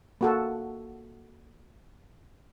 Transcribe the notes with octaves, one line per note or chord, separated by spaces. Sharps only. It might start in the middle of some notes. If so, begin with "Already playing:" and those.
A#3 F#4 A4